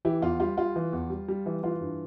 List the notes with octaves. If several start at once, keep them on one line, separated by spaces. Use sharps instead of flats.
E3 E4 G4
E2 F4
G3 F4
G3 F4
E3
E2
G3
G3
E3
E3 F4
G2